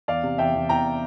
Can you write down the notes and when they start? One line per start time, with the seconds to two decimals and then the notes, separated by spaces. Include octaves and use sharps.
0.08 E2 D5 F5
0.23 C3
0.38 E2 E5 G5
0.54 E2
0.69 E2 G5 A#5